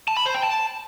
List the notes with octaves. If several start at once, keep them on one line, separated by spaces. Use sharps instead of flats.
A5
B5
C5
G5
A5